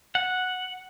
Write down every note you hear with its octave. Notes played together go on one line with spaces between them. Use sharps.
F#5